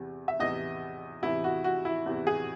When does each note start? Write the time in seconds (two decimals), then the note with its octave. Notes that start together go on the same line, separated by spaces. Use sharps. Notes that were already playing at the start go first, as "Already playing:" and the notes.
Already playing: E2 C3 E3
0.28 E5
0.40 E2 C3 E3 D#5
1.22 E2 C3 E3 E4
1.44 F#4
1.64 F#4
1.85 E4
2.06 E2 C3 E3
2.27 G#4